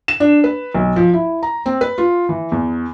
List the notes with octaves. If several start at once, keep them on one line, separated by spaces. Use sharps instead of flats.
E7
D4
B4
B1
F3
E4
A#5
C4
B4
F4
E3
E2